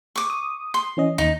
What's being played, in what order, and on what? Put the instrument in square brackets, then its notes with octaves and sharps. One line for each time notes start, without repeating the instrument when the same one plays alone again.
[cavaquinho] C#6 D6
[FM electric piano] D#6
[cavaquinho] C6
[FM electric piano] E3 C#4 D#5
[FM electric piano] D#2 [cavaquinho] D#4